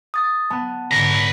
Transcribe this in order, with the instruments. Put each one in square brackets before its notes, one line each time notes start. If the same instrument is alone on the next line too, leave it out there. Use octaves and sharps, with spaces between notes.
[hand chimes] D#6 A6
[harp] B3 F#6 D#7 [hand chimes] A5
[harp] G#2 D3 [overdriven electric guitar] B4 A#5